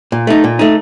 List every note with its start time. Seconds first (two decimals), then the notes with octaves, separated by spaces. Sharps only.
0.12 A#2
0.27 A3 D#4
0.44 A#2
0.59 A3 D#4